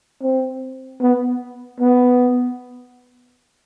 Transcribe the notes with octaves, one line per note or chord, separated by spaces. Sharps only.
C4
B3
B3